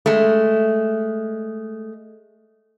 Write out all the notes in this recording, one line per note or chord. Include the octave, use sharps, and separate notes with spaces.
G#3 A3